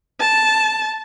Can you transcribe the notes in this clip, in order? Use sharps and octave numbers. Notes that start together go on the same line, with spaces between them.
A5